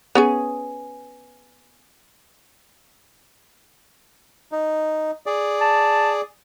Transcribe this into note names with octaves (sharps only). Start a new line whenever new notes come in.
B3 C#4 G#4
D#4
G#4 D5
A5